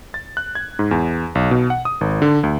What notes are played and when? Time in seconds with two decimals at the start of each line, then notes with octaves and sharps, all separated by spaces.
0.14 A6
0.37 F#6
0.55 G#6
0.79 G#2
0.91 E2
1.35 B1
1.51 B2
1.70 F#5
1.85 D#6
2.01 G#1
2.22 D3
2.43 D2